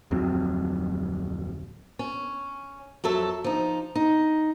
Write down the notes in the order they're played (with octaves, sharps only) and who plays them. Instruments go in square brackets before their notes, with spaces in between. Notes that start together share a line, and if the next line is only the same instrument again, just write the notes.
[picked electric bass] D1 F2 F#3 C4
[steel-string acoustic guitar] C#4
F2 F#3 A4 E5
F3 D#4
D#4